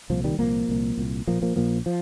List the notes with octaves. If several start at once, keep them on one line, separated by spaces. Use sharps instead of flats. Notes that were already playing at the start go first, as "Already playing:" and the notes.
C2 A#2 F3
D#3 G3
C2 A#2 F3 A#3
C2 A#2
C2 A#2
A#1 A#2 F3 A#3
F3 A#3
A#1 A#2 F3 A#3
F3